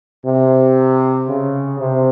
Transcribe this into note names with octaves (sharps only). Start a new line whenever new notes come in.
C3
C#3
C3